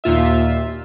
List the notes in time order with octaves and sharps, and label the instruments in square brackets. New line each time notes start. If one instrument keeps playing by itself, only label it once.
[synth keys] D#2 A#2 F4 E5